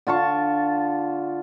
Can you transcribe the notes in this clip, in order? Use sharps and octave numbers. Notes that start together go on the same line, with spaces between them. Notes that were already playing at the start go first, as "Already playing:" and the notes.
D3 F4 A5 C#6